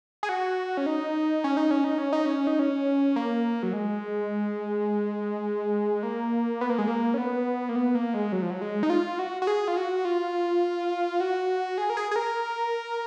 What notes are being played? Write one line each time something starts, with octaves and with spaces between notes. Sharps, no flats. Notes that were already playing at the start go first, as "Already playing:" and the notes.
G#4
F#4
C#4
D#4
C#4
D#4
C#4
D#4
C#4
D#4
C#4
D#4
C#4
A#3
F#3
G#3
A#3
B3
A#3
G#3
A#3
C#4
B3
A#3
B3
A#3
G#3
F#3
F3
F#3
G#3
D#4
F4
F#4
F#4
G#4
F4
F#4
F4
F#4
G#4
A#4
G#4
G#4
A#4